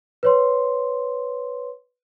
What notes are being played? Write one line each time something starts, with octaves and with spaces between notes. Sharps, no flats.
B4 C#5 C6